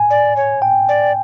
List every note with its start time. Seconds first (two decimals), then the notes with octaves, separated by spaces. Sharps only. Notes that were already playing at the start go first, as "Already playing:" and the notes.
Already playing: G#5
0.10 D5
0.36 C#5
0.62 G5
0.89 D5